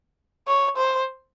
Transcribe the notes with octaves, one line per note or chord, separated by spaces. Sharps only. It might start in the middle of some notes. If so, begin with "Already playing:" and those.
C#5
C5